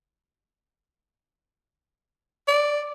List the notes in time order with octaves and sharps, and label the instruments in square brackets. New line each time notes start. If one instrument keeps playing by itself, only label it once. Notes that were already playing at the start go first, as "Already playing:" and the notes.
[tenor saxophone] D5